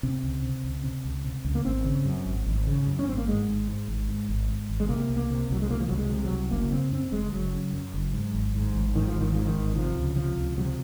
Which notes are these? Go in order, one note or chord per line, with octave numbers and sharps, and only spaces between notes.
C3 C4
C#2
C3
C#2
C3
C#2
C3
C#2
A#3
G#1 C4
C#3
F#2
G#1
G#1
C#3
F#2
C#4
G#1 C4
A#3
G#2 G#3
G#1
G#2
G#1
G#2
G#1
G#2
G#1
G#3
C3 A#3
C2
A#3
C3
C2 F#3
G#3
C3 A#3
F3
C2 F#3
G#3
C3
F#3
C2
F#1 A#3
C#3 C4
F#2 C4
F#1 G#3
F#1 F#3
C#3
F#2
F#1
G#2
G#1
G#2
G#1
G#2 D#3
F3
G#1
D#3
G#2 F3
D#3
G#1
C3 F3
C#2
C3 F3
C#2
C3 F#3
F3